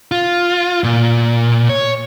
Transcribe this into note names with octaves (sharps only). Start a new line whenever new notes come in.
F4
A#2
C#5